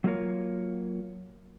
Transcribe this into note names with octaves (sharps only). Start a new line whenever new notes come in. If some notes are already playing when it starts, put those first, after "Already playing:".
F#3 A3 A#3 F4 A#4 C#5